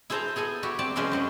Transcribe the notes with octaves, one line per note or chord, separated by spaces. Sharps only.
E4 G#4 A4 C5 A5 A#5
B3 G#4 A4 G#5
E4 F#4 G4
C4 D5 A5
C3 F3 G#3 C#4 B4 C5
F#2 F#3 C5